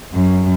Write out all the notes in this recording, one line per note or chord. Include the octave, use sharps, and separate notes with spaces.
F#2